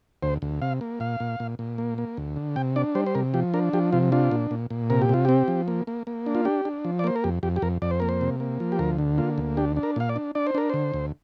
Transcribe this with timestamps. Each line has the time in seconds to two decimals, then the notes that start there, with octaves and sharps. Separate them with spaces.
0.23 D2 C5
0.42 D2
0.62 C3 F5
0.81 A#3
1.00 A#2 F5
1.20 A#2
1.40 A#2
1.59 A#2
1.78 A#3
1.98 A#3
2.17 D2
2.36 D3
2.56 C3 G5
2.76 D4 D5
2.95 G3 C5
3.06 C5
3.15 C3 A#4
3.34 F3 G4
3.54 D4 A#4
3.73 F3 G4
3.93 C3 F4
4.12 D4 F4
4.31 A#2
4.51 A#2
4.70 A#2
4.90 C3 A#4
5.02 G4
5.09 C3 F4
5.25 C4 G4
5.48 F3
5.68 A#3
5.87 A#3
6.07 A#3
6.26 D4
6.35 F4
6.45 D4 G4
6.65 D4
6.85 F3
6.99 D5
7.04 A#3 C5
7.16 A#4
7.24 F2 G4
7.43 F2 G4
7.56 G4
7.62 F2 A#4
7.82 F2 D5
7.91 C5
8.00 A#3 A#4
8.09 C5
8.21 C3
8.40 A#3
8.60 F3
8.72 G4
8.79 D2 A#4
8.98 D3
9.18 A#3 F4
9.38 D2
9.57 D4 G4
9.76 D4
9.83 A#4
9.96 A#2 F5
10.09 D5
10.16 D4
10.35 D4 D5
10.47 C5
10.55 D4 A#4
10.69 D3 C5
10.94 D2